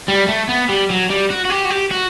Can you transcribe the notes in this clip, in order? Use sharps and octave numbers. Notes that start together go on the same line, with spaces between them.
G3
A3
B3
G3
F#3
G3
F#4
F#4
G4
F#4
G4
F#4